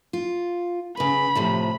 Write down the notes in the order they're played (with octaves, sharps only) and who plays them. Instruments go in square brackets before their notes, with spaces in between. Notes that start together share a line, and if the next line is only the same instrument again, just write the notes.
[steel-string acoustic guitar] F4
[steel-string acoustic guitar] C#3 B4 [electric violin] B5
[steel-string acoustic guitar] A2 C3 F3